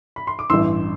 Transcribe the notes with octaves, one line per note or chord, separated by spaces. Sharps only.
B5
C6
D6
A1 G2 E3 C6 E6